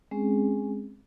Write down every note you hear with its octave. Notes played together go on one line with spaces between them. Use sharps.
G#3 C4 C#4 G#4